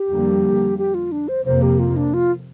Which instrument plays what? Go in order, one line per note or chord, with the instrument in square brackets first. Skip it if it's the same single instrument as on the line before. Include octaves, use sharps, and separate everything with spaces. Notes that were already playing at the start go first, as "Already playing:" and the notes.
Already playing: [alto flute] G4
[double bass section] F2 D3 G3 A#3
[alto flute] G4
F4
D4
C5
[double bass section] F2 C3 A#3 [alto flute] C5
[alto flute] G4
F4
D4
F4